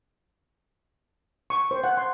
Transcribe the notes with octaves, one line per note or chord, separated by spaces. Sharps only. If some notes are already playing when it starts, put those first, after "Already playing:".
C#6
C5
F#5
C6